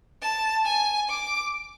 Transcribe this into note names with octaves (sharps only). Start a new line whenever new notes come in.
A5
G#5
D6